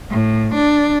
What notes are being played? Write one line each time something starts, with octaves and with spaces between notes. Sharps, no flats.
A2
D4